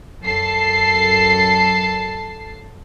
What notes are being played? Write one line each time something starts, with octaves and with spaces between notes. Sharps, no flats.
F#2 A4 A5 C7